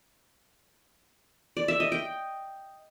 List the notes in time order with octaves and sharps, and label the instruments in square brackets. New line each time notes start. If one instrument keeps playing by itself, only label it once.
[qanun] D5
E5
D#5
G5